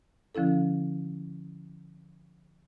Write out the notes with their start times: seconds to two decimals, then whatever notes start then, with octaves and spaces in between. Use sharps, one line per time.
0.35 D3 F3 C#4 E4 A4